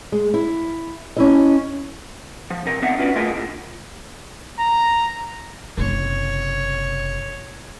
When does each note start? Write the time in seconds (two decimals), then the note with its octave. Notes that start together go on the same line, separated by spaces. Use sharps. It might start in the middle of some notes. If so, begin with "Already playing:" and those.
0.12 G#3
0.34 E4
1.17 C#4 E4 D#5
2.50 F3
2.66 C3 A#4
2.82 B3 C4 D4 D#4 E5 F#5
2.99 C#4 F4 F#4 B4 D5
3.15 A3 B3 F4 G#4 A#4 D#5
3.32 D2 A2
4.59 A#5
5.78 F#1 C3 C#5